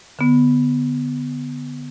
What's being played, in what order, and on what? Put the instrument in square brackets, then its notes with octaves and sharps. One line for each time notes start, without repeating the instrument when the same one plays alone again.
[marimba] D3 B3